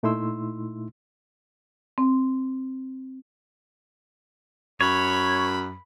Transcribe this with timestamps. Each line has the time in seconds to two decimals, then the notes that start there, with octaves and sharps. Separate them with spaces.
0.03 A#2 A3 D#4 E4 C6 E6
1.98 C4
4.81 F#2 C#5 B5